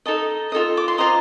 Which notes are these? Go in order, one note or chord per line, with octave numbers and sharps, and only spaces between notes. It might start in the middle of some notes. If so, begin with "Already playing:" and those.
D#4 A4 D#5 A5
F4 A4 D#5
D6
C6
F4 C5 D#5 A#5